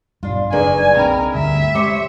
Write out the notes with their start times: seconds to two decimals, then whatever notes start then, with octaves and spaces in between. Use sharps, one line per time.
0.23 B1 G2 D4 F4
0.52 F#1 D#3 A#3 D4 G#4 B4 D5 G#5
0.97 C2 C4 D4 A#4 G5 B5
1.35 D2 G2 D3 E5
1.75 G#3 G4 C5 C#5 D6 C#7